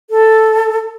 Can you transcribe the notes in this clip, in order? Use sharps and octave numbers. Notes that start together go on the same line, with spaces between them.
A4